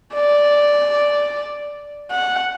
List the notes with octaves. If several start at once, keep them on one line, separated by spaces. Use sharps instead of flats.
D5
F#5